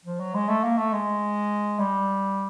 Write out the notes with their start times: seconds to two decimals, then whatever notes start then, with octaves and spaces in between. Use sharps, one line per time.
0.05 F3
0.19 F#3
0.34 G#3
0.48 A3
0.63 A#3
0.78 A3
0.92 G#3
1.79 G3